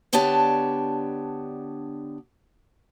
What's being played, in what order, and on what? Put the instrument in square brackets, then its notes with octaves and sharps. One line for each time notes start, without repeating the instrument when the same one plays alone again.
[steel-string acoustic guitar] D3 B3 D4 G4 C#5 A5